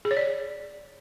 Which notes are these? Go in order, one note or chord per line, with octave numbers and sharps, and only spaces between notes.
G#4
C#5
D5